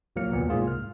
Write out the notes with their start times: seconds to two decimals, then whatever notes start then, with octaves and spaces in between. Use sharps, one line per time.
0.16 C2 A#2 F#3 A#3 F6 C#7
0.32 D#2 A#2 B3
0.49 C2 G#2 A#3 F4 G#4
0.67 F6